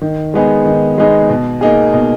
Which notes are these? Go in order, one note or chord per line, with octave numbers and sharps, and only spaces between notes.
D#3
G#3 B3 D#4 G#4
D#3
G#3 B3 D#4 G#4
B2
A#3 D#4 G#4
B2